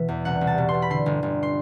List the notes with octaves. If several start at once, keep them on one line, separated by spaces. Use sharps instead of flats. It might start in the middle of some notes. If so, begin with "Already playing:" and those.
Already playing: B2 E3 E5
E2
C2 F#5
C2
A5
B2
C6
B2
B5
D3 C6
G1
G1
C6